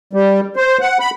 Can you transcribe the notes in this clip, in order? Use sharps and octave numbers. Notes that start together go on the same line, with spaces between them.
G3
C5
F#5
B5